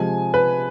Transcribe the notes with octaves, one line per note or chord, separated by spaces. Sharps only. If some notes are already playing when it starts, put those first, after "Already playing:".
Already playing: C3 F3 G#3 G#5
B4